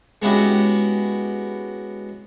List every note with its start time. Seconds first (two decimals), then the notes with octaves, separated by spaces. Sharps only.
0.22 G#3 B3 C#4 E4 F#4 G4